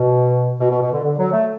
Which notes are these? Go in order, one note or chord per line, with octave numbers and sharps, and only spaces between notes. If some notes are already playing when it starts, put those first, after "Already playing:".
Already playing: B2
B2
B2
B2
D3
D3
F#3
A3